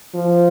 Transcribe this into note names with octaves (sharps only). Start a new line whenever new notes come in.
F3